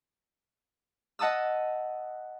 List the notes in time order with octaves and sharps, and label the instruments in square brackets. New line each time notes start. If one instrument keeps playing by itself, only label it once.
[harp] D#5 F#5 A5 D#6 E6